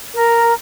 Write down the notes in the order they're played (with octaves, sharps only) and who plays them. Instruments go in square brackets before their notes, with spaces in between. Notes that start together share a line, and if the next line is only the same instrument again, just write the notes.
[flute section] A#4